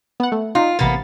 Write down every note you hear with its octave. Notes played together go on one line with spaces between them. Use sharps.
B3 F#5
A3
D#4 F4
A1 C3 A#3 B3 A6